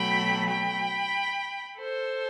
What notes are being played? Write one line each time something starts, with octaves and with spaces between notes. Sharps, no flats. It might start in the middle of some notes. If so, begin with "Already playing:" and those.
Already playing: B2 F#3 A3 G5 B5
G5 B5
A4 C5